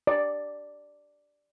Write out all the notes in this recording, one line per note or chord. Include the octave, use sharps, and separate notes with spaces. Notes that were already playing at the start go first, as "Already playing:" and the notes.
D5